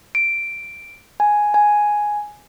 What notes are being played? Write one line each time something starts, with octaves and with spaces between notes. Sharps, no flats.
D7
G#5
G#5